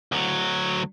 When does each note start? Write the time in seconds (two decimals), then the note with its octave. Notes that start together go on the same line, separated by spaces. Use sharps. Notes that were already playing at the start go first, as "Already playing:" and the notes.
0.12 D2 F#3